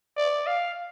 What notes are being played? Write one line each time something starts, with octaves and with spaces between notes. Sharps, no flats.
D5
F5